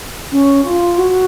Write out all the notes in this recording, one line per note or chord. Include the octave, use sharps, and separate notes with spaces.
C#4
F4
F#4